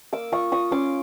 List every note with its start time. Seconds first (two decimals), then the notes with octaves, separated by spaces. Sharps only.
0.13 A#3 D6 E6
0.32 F4 C#6 D#6
0.52 F4 C#6 D#6
0.71 C#4 C6 D6